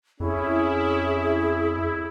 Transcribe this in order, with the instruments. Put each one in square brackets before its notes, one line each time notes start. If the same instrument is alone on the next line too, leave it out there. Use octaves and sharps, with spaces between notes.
[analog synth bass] F2 [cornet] C#4 [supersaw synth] E4 [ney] G#4